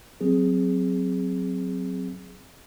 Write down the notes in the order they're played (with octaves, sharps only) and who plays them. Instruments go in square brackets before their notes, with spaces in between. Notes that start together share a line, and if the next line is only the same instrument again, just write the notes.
[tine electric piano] F#3 C4 G#4